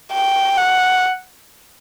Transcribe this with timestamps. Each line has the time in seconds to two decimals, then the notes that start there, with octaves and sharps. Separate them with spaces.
0.13 G5
0.58 F#5